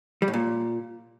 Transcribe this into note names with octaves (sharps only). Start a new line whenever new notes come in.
G3
A2
A#2